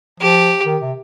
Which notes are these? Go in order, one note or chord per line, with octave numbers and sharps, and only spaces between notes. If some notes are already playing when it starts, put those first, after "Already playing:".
F3 G4
D#3
C3